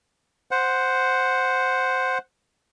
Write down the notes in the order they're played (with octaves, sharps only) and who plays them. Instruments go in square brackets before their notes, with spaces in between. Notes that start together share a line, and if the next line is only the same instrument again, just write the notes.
[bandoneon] C5 F#5